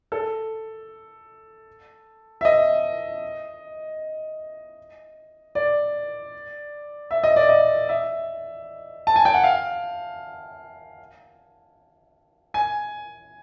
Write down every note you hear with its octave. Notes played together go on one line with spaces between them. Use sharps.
A4
E5
D#5
D5
E5
D#5
D5
D#5
E5
A5
G#5
G5
F#5
F5
G#5